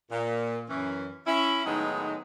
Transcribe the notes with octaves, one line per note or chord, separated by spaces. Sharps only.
A#2
F#2 E3 C#4
C#4 E4
A2 D#3 F#3 G#3 B3 D#4